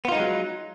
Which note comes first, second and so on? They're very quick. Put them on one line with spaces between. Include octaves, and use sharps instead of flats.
B3 F4 D#4 G#3 F#3